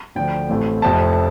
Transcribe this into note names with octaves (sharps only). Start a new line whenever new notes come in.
D2 D3 F3 D4 G5
A1 A2 A3 C4
F1 F2 C3 A5